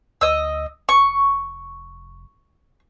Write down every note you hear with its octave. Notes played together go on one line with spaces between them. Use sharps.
D2 D#5 E6
F1 C#6